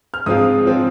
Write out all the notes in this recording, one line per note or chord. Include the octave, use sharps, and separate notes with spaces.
F6
G#2 F3 G#3 C4 F4 D#6
F3 G#3 C4 F4